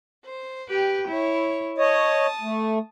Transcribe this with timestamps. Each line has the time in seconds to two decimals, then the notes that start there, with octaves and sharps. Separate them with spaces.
0.25 C5
0.68 G4 B4 G5
1.08 E4 C#5
1.78 C#5 D#5 A5 D#6
2.41 A3